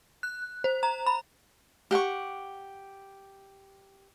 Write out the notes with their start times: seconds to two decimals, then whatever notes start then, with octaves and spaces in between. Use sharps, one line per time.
0.23 F#6
0.64 C5
0.83 A#5
1.06 B5
1.91 G4 F#5 G#5 C#6